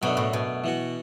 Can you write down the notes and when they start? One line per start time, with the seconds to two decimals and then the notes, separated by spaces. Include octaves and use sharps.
0.02 F#2 B2 F#3 A3 D4
0.17 A2
0.33 B2
0.64 E3 B3 F#4